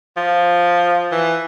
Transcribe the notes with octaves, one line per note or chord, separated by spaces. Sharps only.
F3
E3